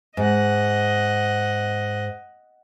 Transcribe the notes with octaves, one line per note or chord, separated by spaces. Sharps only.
G#2 D#5 F#5